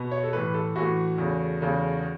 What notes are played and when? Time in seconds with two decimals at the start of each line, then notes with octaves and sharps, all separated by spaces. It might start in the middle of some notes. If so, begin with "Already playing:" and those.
Already playing: B2 B3
0.11 C#5
0.24 A4
0.33 A2 E3 A3 B4
0.54 A4
0.75 A2 E3 A3 F#4
1.18 E2 C#3 A3
1.61 E2 C#3 A3